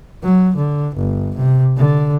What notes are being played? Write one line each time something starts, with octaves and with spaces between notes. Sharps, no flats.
F#3
D3
G1
C3
D3